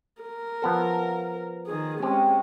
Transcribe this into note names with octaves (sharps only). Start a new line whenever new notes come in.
A#4
F3 B3 A4
D#3 G#4
G#3 C4 C#4 G4